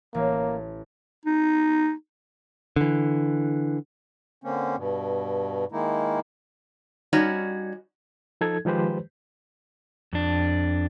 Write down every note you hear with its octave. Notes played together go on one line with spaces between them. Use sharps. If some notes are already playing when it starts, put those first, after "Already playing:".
A1 A#3
D#4
D3 E3
D3 A#3 C4 C#4
G2 B2
D#3 G#3 A#3 D#4 E4
G3 C#4 D#4 F#4 C#5 D5
F3 D#4 A4 G#6
D#3 F3 G#3 G4 B4 C5
F2 D4